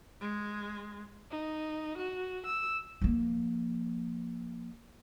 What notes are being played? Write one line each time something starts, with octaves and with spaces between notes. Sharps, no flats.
G#3
D#4
F#4
E6
F3 A#3